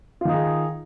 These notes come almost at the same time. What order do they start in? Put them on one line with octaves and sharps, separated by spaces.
F4 D#3 D#4 G#4